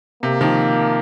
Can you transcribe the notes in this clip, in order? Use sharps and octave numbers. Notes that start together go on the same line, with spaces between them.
C3 A#3
D#3 F3